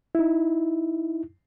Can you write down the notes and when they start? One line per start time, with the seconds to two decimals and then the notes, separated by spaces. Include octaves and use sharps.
0.15 D#4 E4